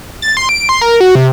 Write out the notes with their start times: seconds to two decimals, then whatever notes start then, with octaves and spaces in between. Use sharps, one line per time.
0.22 A6
0.37 C6
0.49 D7
0.69 C6
0.81 A#4
1.00 F#4
1.15 C3